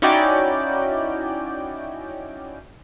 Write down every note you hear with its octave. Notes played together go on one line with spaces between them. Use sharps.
C#4 D#4 E4 F#4 D5 G5